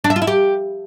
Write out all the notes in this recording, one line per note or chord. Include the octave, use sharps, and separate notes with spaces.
D4
E5
F4
E4
G4